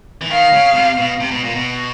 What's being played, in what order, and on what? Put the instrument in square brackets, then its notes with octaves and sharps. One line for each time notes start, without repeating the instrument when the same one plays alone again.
[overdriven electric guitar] E3
[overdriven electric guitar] D#3 [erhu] F5
[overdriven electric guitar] C#3
C3
B2
C3
B2
A#2
B2